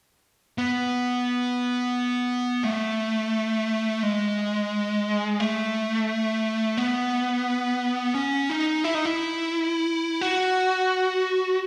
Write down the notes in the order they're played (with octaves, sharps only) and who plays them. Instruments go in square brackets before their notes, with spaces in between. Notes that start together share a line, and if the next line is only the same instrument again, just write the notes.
[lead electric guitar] B3
A3
G#3
A3
B3
C#4
D#4
E4
D#4
E4
F#4